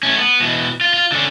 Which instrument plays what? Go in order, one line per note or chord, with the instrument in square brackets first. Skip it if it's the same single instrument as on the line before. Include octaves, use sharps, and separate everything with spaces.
[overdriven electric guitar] A3 C#4
B3
B2 E3
F4
F4
D3 C#4